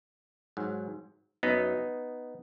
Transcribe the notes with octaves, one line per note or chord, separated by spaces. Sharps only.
G#2 F#3
F#2 F#3 B3 D#4